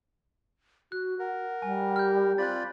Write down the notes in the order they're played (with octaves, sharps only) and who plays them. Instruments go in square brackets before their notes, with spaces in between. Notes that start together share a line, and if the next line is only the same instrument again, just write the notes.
[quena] F#4 [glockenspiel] F#6
[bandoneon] A#4 [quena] F#5
[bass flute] G3 [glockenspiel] G#5
[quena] G4 [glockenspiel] F6 G6
[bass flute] C4 [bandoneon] F4 D5 B5 [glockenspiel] F#6 A6